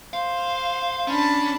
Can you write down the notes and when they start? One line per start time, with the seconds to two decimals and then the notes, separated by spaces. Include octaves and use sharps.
0.14 C5 F5
1.08 C#4 D4 A5 B5